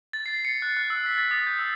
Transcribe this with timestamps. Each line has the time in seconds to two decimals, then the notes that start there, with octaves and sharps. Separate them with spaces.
0.13 A6
0.26 C7
0.45 C#7
0.62 F#6
0.77 F#6
0.90 E6
1.06 B6
1.18 A6
1.31 D#6
1.47 G6
1.59 E6